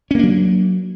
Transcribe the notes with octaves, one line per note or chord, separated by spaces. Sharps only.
F#3 A#3 C#4 D4